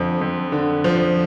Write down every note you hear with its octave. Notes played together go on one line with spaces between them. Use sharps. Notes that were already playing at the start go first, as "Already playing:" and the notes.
Already playing: F2 D3 F3
F2
D3
F3